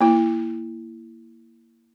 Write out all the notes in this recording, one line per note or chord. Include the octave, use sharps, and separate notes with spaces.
A#3 E4